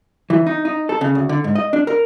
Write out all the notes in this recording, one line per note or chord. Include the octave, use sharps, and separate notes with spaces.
E3
D#4
D#4
A4
C#3
D2
D3
G#2
D#5
D4
A#4